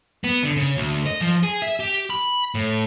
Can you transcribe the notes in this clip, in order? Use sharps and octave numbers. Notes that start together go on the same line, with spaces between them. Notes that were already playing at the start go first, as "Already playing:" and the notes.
B3
D3
C#3
D2
D#5
F3
G#4
E5
G4
B5
A2